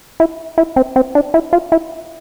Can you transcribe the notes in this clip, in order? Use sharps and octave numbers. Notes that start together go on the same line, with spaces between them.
E4
E4
C4
C4
D4
E4
F4
E4